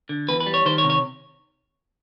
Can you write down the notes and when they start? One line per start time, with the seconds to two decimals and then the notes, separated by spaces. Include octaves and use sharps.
0.09 D3
0.28 E2 B4
0.40 B4
0.46 G3
0.54 C#5
0.66 D#3 C5
0.78 C#5
0.84 C3
0.90 C#5